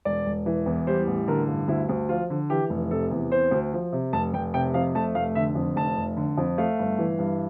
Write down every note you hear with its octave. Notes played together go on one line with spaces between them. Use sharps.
E1 D5
E1
E3
E2
G3 C5
A1
D3 A#4
G2
D2 E4
D2
F3 F4
D3
E3 G4
F1
C3 A4
E2
C4 C5
D2
F3
C3
F1 A5
F1 G5
C3 G5
F2 F5
A3 A5
F1 F5
D3 E5
F2
F1 A5
F1
D3
F2
A3 F5
G1
E3
G2